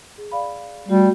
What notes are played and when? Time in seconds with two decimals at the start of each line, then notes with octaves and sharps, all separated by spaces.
0.18 G#4
0.32 D5 F5 B5
0.89 G3 A3 F#4